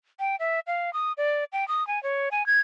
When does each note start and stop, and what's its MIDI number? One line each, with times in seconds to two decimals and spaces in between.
0.19 0.36 79
0.39 0.60 76
0.67 0.93 77
0.93 1.12 87
1.17 1.44 74
1.53 1.67 79
1.68 1.86 87
1.87 2.01 80
2.03 2.29 73
2.31 2.46 80
2.46 2.60 92